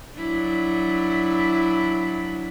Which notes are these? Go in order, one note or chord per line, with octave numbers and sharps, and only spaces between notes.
F#3 D4 E4